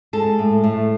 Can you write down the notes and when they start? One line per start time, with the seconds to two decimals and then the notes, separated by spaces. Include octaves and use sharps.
0.13 G#3 A4
0.38 A2
0.64 A2